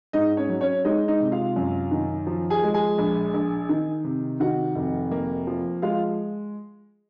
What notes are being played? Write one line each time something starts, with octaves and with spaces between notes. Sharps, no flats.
G#2 D#4 D#5
C#4 C#5
F#3
C#4 C#5
G#3 D#4 D#5
D#4 D#5
C3
F4 F5
F#2
D#3
F3
G#4 G#5
G#3
G#4 G#5
A#1
A#1
D#3
C3
D#3 F#4 F#5
F1
A#3
F3
G#3 F4 F5